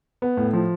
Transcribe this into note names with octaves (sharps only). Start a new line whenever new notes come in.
B3
A2
F3